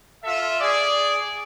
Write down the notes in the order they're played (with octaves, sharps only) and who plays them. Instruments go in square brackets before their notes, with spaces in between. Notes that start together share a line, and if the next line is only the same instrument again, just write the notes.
[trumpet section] F4 A4 E5
G#4 D5